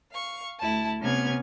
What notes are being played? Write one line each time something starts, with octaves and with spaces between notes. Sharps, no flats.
F5 C#6
D2 E4 A5
C3 B3 C#4 F6 G#6